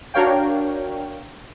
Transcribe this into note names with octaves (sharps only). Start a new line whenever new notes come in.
D4 F#4 A#4 C#5 F5 G5